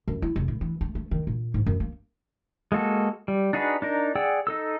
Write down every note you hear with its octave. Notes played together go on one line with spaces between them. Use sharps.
F#2
E4
F1
A2
E3
A3
A3
D#3
A#2
G#2
F#2
A#3
G#3 A#3 F#4 A4
G3
D4 D#4 F#4 G#4 B4
D4 D#4 A#4
G#4 D5 F#5 G5 E6
D#4 A4 E6